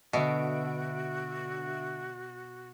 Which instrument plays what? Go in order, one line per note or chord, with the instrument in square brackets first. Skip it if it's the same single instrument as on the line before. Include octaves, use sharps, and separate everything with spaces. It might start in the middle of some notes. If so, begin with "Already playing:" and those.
[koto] B2 [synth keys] D3 E5 D7 [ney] F#4